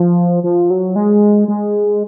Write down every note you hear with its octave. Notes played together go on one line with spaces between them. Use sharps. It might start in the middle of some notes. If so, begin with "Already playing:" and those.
Already playing: F3
F3
F#3
G#3
G#3